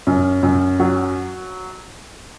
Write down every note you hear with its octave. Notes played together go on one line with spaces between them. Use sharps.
F#2
F#2
F#3